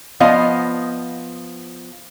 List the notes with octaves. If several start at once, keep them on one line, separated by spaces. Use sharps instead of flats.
F3 B3 D#5 F5